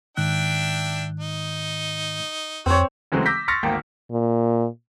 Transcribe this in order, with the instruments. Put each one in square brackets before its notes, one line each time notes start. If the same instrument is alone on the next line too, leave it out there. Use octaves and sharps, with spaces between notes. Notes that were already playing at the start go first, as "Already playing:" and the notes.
[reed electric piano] G#2 D#3 F#6 [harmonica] D4 E5 G5
[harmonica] D#4
[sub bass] F2 [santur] C4 C#5 [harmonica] F#4
[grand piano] C#3 E3 F#3 G#3 A3 C4
D6 E6 G6 A#6 B6
C6 C#6 F6 A6 A#6 C#7
G#1 D2 A#3 G5
[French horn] A#2